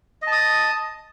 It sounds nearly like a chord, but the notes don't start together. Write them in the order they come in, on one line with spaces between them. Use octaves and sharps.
D#5 A5 D#6